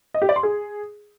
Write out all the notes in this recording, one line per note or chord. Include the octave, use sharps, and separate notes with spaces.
D#5
G4
D5
C6
G#4